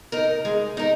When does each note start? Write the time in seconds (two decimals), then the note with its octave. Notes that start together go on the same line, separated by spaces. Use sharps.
0.12 D#4 A#4
0.45 G#3
0.77 D#4 A#4